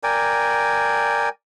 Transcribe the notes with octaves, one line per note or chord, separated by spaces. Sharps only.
A#4 D5 G5 G#5